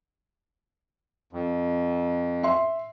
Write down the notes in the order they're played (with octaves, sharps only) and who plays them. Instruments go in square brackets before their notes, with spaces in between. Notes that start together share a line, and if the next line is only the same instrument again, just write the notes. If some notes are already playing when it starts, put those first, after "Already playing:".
[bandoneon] F2
[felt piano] E5 C6